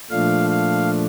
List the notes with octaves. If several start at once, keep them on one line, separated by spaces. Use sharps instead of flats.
A#2 F3 A3 D4 F5
F5